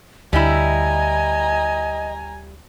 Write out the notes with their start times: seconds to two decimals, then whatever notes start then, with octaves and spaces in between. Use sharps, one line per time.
0.33 D2 G3 E4 D#5 G#5 A#5